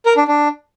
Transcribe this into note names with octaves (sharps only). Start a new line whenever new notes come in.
A#4
D4
D4